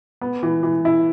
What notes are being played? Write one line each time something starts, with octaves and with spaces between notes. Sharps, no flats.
B3
E3
E3
E4